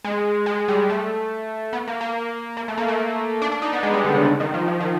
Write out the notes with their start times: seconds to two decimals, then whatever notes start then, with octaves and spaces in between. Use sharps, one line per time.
0.04 G#3
0.46 G#3
0.68 G3
0.89 A3
1.73 B3
1.88 A#3
2.01 A#3
2.57 A#3
2.68 A3
2.78 A#3
2.88 A3
3.42 D4
3.52 D4
3.62 D#4
3.73 B3
3.83 G#3
3.94 G3
4.04 D3
4.15 C#3
4.26 C#3
4.40 D#3
4.54 F3
4.68 F3
4.80 D#3